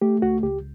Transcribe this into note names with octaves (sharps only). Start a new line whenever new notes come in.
A3 G4
C#2 F#4
C#2 G4